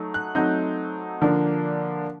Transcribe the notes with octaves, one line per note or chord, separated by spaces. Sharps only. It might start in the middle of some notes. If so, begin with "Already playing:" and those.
Already playing: F#3 A3 D#4
F#6
F#3 A3 C4 D#4 G6
D3 F3 A#3 D4